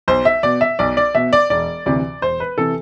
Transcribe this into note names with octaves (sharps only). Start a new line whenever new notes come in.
B1 C5
E5
B2 D5
E5
B1 D5
D5
B2 E5
D5
E1 D5
D2 C3 E3 D5
E1 C5
B4
C3 E3 A4